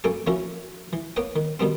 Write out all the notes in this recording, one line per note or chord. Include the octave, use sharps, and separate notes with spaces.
F#2 A#3 A4 G5 G#5 C#6
E3 F3 A#3 C#4 E4 F#4
E3
A#3 B3 B4 C#5 G5
D#3
B2 D#3 G3 B3 C4